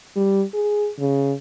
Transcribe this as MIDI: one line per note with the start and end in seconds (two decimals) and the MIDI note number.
0.16 0.44 55
0.54 0.90 68
0.99 1.34 49